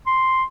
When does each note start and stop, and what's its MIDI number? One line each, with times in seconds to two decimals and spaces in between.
0.07 0.44 84